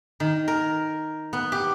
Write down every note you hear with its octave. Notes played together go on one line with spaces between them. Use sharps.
D#3
A#4
B3
G4